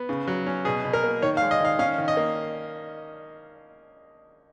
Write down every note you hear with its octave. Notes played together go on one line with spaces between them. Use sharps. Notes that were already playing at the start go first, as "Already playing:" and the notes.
Already playing: B3
C#3
F#3
C#4
B2 G#4
B2
A#4
A#3
D#3 C#5
F5
G#3
D#5
D#3 F5
C#4 F5
D#3
D#5
A#3